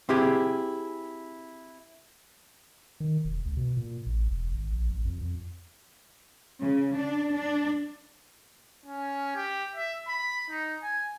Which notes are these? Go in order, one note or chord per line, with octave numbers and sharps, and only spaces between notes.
C4 E4 G4 G#4
D#3
E1
C#2
B2
A#2
A1
E1
G#1
A#1
A1
F2
F2
C#3
D4
D4
C#4
G4
E5
B5
D#4
G#5